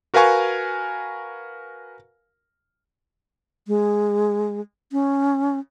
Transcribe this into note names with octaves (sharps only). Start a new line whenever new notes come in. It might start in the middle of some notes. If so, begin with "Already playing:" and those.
F#4 A#4 B4 F5 G#5 C#6
G#3
C#4